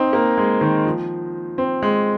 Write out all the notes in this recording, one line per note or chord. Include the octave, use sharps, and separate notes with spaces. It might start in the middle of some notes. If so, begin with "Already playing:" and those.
Already playing: C4 D#4
A#3
G#3
D#3
F3
C4
G#3